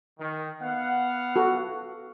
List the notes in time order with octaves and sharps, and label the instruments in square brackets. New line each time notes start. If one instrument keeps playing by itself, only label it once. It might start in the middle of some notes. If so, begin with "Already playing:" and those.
[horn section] D#3
B3 F5 F#5
[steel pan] F#4 A4